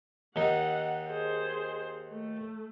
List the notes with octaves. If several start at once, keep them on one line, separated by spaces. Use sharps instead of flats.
D#2 D#4 F#5
G#4 C5
A3